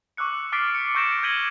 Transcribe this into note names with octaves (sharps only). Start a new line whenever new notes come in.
C#6 D6 E6 F#6 C#7
D6 F6 A6 B6 C7 D7
C#7
C#6 E6 G6 A#6 D7 E7
G6 G#6 B6 D#7 F#7 G7